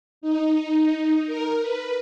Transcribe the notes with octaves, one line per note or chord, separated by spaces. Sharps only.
D#4
A#4
B4